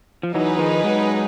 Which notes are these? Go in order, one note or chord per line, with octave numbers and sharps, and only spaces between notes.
F3
E3 F#3 D#4 G#4 B4
D#3 F3
F#3 G#3